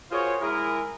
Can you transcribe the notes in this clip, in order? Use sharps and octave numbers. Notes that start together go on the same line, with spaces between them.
F4 F#4 G#4 A#4 C5 C#5
G#3 E4 G#4 A#4